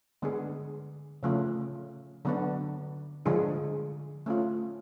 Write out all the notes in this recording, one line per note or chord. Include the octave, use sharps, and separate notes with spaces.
D3 G#3 B3 D4 G#4
C#3 F3 A3 C#4 F4
D3 F#3 B3 D4
D3 F3 G#3 D4 G#4
A3 C#4 F4